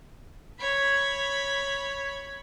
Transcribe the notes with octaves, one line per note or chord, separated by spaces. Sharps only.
C#5 B5